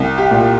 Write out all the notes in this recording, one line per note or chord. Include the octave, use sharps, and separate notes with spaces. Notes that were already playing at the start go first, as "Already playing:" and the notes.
Already playing: C2
G4
A#2